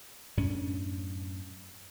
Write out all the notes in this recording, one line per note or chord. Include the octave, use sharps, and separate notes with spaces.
F#2 A2 C#4 D4